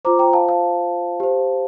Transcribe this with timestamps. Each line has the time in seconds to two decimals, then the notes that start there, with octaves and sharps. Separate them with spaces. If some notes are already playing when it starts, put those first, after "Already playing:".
0.05 F4 C5 A#5 D6
0.19 G5 A#5
0.33 F5 A5
0.48 F5 A5
1.20 G4 C5